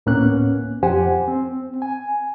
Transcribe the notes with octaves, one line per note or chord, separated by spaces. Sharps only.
D2 A2 A#3 B3 C#4 F#6
F2 G4 C5 F#5 G#5
C4
G#5